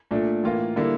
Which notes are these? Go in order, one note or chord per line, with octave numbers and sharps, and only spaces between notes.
A#2 A3 D4
A2 E3 A#3 F4
D3 G3 A#3 E4